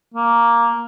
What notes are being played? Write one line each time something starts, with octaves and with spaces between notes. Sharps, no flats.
A#3